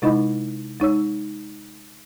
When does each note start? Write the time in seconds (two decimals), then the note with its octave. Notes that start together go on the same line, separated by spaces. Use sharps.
0.02 C3 G#3 D#4 E4 D#5 B5
0.80 G#3 D#4 C#5 E6